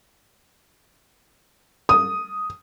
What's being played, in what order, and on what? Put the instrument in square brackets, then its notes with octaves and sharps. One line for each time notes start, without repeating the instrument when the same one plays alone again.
[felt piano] D#6